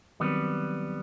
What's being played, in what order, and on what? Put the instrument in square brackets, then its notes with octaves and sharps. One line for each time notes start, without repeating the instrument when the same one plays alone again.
[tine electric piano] D#3 F#3 C4 [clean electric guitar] G3 B3